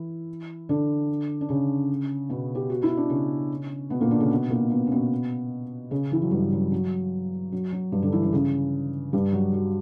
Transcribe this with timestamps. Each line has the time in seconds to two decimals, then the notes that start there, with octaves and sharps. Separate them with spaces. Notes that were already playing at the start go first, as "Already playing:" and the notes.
Already playing: E3 E4
0.69 D3 D4
1.41 D4
1.49 C#3 C#4
2.30 B2 B3
2.55 G4
2.70 F#4
2.83 E4
2.97 D4
3.09 C#3 C#4
3.90 B2 B3
4.01 A#2 A#3
4.11 D3 D4
4.20 C#3 C#4
4.31 B2 B3
4.50 A#2 A#3
4.71 B2 B3
4.87 C#4
4.92 B2 B3
5.91 C#3 C#4
6.11 E3 E4
6.22 F#3
6.31 G2 G3
6.52 F#3
6.72 F#3
7.52 F#3
7.72 F#3
7.92 G2 G3
8.02 D3 D4
8.12 E3 E4
8.23 D3 D4
8.32 C#3 C#4
9.13 G2 G3
9.33 F#3 F#4
9.53 F#3 F#4